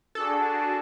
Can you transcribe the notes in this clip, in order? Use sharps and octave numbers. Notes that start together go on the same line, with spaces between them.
D4 F#4 G#4 A4